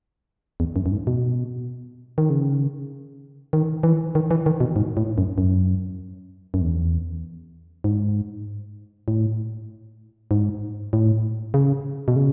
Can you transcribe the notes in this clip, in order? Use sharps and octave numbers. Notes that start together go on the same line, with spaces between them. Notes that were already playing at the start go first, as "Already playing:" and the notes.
E2
F#2
F#2
G#2
B2
D#3
C#3
D#3
E3
D#3
E3
D#3
B2
G#2
A2
F#2
F#2
F#2
E2
G#2
A2
G#2
A2
C#3
B2
C#3